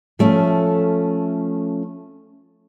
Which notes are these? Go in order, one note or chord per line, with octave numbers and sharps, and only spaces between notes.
F3 A3 C#4